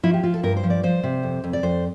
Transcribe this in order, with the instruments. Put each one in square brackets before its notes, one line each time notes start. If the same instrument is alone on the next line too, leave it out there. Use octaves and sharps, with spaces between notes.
[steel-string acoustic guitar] F3 E4
G4
F3 F4
A4
G2 A#4
C5
F3
D5
F3 C5
C3
F2
F2
D5
F2 C5